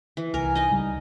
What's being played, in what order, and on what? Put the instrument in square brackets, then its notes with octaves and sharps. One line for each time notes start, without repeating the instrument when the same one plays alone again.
[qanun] E3
[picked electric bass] C2 [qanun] A#4 [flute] G#5
[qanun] D#4 D#5
[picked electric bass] C#2 C#3 G3